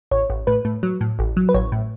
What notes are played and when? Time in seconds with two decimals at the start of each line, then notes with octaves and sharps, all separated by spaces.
0.11 A1 C#5
0.30 A1
0.47 A2 B4
0.65 A2
0.83 F#3
1.01 A2
1.19 A1
1.37 F#3
1.49 B4
1.54 A1 C#5
1.72 A2